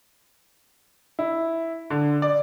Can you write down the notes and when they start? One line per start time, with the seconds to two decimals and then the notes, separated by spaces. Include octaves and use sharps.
1.19 E4
1.90 D3
2.22 D5